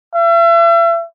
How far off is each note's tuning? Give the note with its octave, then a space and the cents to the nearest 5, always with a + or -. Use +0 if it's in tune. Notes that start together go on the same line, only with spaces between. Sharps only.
E5 +40